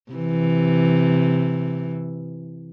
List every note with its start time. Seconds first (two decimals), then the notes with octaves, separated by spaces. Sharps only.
0.12 C3 E3